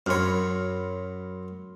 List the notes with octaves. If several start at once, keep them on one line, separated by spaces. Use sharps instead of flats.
F#2 C#5 B5 C6 F6